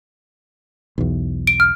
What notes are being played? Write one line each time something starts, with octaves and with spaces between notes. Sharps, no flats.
B1 E2
D7
F6